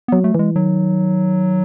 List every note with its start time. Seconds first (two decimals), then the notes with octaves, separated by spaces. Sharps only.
0.08 F#3 B3
0.24 A3
0.35 E3 G#3
0.56 D#3 F#3